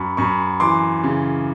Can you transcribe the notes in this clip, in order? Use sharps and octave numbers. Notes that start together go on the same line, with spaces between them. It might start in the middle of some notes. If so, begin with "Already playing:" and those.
Already playing: F#2 B5 C#6
F#2 B5 C#6
E3 C6 D6
C#3